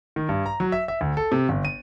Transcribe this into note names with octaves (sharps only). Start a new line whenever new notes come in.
D#3
G2
A#5
F#3
E5
E5
D2
A4
C3
G1
D#7